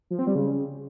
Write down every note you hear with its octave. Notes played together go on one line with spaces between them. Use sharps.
F3
C4
G3
C#3